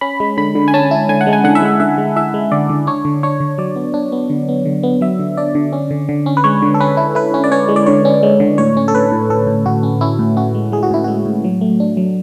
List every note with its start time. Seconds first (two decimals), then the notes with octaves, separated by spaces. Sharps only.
0.01 C#4 B5
0.20 G#3
0.37 D3 B5
0.55 D3
0.68 G#5
0.74 C#4 A5
0.91 E4
1.09 D3 G#5
1.21 F#5
1.27 G#3
1.33 G#5
1.44 D3 F#5
1.55 E5
1.62 G#3 F#5
1.80 D3 E5
1.98 G#3
2.16 E4 E5
2.34 G#3
2.52 D3 D5
2.70 D3
2.87 D4 C#5
3.05 D3
3.23 D4 C#5
3.40 D3
3.58 F#3 D5
3.76 B3
3.94 D4
4.12 B3
4.30 D3
4.49 B3
4.65 D3
4.83 B3
5.01 F#3 E5
5.19 D3
5.37 D4 D5
5.55 D3
5.73 C#4
5.91 D3
6.09 D3
6.26 C#4
6.37 B4
6.44 G#3 C#5
6.62 D3
6.74 A4
6.80 C#4 B4
6.97 E4
7.15 E4 B4
7.34 C#4
7.44 D5
7.52 C#4 C#5
7.69 G#3
7.76 D5
7.86 D3 C#5
8.05 C#4
8.23 G#3
8.40 D3
8.58 A2 C#5
8.77 C#4
8.88 A4
8.94 A2 B4
9.12 A2
9.30 A2 A4
9.47 A2
9.65 A2 F#4
9.83 C#4
10.01 C#4 E4
10.19 A2
10.37 C#4 F#4
10.55 G#3
10.72 G#3 G#4
10.83 F#4
10.91 A2 E4
11.04 G#3 F#4
11.25 A2
11.44 F#3
11.61 A3
11.80 D4
11.97 F#3